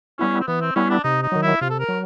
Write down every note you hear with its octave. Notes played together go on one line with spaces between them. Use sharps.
G3 B3 C#4 E4
C4
E3 B3
C4
G3 B3 C#4 E4
D4
C3 D#4
D#4
D#3 F#3
E4
C3 F4
A4
A#4
F#3